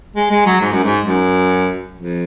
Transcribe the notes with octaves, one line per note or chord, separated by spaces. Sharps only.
G#3
G#3
F#3
G#2
F#2
G#2
F#2
F2